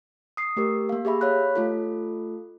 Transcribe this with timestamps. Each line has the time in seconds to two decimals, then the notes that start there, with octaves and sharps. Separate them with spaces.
0.37 D#6 C7
0.57 A3 G4 A#4
0.89 A#3 F5
1.05 G4 G#4 E5 B5
1.21 C#5 F5 B5 F#6
1.55 A3 F4 A4